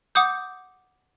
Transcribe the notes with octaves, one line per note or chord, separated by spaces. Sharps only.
F#5 D6 D#6 G6